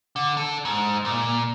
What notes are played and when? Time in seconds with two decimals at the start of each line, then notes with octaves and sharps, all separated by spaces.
0.16 D3
0.37 D4 A4
0.65 G#2
1.05 A#2